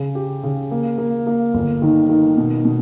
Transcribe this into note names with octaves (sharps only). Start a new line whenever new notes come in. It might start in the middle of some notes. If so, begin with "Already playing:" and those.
Already playing: C#3
G4
C#3
A#3
A#3
A#3
G1
D#3
D#3
B2
B2